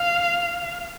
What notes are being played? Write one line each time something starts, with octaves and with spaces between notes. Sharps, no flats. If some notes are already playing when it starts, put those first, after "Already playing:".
Already playing: F5